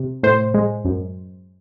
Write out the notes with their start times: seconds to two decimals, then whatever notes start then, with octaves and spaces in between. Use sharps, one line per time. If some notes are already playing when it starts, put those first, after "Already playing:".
Already playing: C3
0.23 A2 C5
0.54 G#3
0.85 F#2